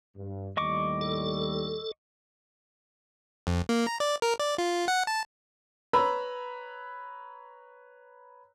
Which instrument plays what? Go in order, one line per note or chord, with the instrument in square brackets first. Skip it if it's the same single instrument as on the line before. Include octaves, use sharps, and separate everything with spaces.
[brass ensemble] G2
[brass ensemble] D#2 A2 G3 [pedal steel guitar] D#5 C#6 D6
[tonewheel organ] A4
[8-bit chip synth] F2
A#3
A#5
D5
A#4
D5
F4
F#5
A5
[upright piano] B4 C#5 A#5 B5 E6